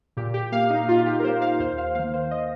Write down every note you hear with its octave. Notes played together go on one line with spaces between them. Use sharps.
A#2 G4
G4
A#3 F5
D#4
A#2 F4
F4
G4
A#4
A#3 C5
F5
D#2 C5
F5
D#3 A#3 F5
C5
D#5